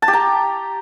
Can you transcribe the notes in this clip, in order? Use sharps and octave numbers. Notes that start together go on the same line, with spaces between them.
A5
G4
A#5